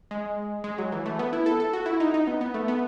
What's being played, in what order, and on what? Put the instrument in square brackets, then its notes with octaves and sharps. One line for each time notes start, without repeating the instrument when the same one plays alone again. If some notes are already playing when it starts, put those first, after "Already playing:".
[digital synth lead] G#3
G#3
F#3
E3
A3
B3
E4
A4
A4
F#4
E4
D#4
D#4
B3
B3
A3
B3